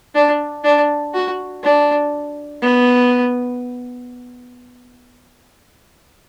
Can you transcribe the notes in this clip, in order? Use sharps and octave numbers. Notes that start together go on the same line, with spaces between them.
D4
D4
F#4
D4
B3